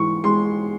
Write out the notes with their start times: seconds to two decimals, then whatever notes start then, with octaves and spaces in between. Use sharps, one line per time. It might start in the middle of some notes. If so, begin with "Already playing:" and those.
Already playing: G#2 E3 C#6
0.24 G#3 C6